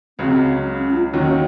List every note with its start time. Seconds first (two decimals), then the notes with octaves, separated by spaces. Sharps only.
0.19 C#2 C#3 F#3 C4
0.78 C#4
0.91 F4
1.13 D#2 D#3 F#3 C#4